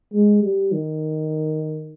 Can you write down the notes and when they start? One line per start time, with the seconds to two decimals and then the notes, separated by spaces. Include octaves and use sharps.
0.14 G#3
0.43 G3
0.72 D#3